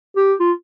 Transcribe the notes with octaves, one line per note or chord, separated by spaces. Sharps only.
G4
F4